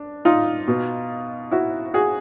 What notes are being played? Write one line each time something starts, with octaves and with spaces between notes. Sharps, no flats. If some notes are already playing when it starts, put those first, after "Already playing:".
Already playing: D4
D#4 F4
B2
E4 F#4
F#4 G#4